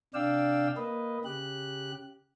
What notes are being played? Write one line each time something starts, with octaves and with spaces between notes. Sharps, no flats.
C3 D4 D5 F5 G5 E6
A#3 B4 D#5
C#3 G4 F#6